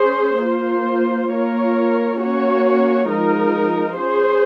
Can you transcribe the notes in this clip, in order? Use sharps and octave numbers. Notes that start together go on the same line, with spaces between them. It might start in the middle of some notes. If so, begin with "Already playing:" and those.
Already playing: C#4 G#4 C5
A#3 F4 C5
A#3 F4 A#4 C#5
A#3 C#4 F#4 C#5
F3 G#3 D#4 A#4
C#4 G#4 C5